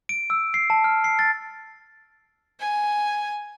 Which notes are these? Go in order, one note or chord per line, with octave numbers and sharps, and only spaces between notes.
D7
E6
C7
A5
F6
C7
A6
G#5